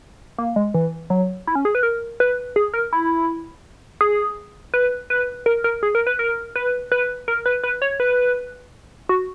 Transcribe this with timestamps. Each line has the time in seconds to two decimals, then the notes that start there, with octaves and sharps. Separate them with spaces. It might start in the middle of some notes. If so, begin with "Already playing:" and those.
0.38 A#3
0.56 G#3
0.74 E3
1.10 F#3
1.47 E4
1.55 C#4
1.65 G#4
1.75 B4
1.83 A#4
2.20 B4
2.56 G#4
2.74 A#4
2.93 E4
4.01 G#4
4.74 B4
5.10 B4
5.46 A#4
5.64 A#4
5.83 G#4
5.95 A#4
6.07 B4
6.19 A#4
6.56 B4
6.92 B4
7.28 A#4
7.46 B4
7.64 B4
7.82 C#5
8.00 B4
9.09 F#4